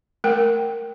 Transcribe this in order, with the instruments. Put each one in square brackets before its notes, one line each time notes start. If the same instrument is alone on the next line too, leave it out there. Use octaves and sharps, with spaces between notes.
[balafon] A3 A#4 G5